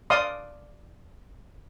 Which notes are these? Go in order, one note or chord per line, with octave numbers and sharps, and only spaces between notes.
D5 F5 C6 D#6